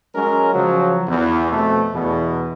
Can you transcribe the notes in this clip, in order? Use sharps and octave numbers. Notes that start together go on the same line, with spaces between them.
F#3 G#3 C#4 A#4
C#3 F3 F#3
E2
F2 B2 A3
E2 B2